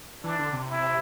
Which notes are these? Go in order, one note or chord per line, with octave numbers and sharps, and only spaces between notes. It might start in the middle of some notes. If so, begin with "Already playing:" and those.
E3 D4
D3
C3
E4